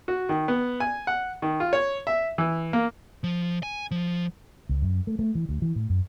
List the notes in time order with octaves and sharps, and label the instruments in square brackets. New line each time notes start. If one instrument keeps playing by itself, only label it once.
[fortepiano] F#4
D#3
B3
G#5
F#5
D#3
F4
C#5
E5
E3
A#3
[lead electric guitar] F3
G#5
F3
[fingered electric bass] C#2
F#2
A3
A3
E3
D2
E3
A2
F#2